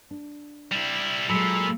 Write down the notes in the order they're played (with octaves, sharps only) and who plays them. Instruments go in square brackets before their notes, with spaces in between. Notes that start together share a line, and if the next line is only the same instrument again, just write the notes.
[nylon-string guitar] D4
[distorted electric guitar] G3 E4
[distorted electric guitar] A#2 [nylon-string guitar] F#3 G#3 [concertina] A4 B5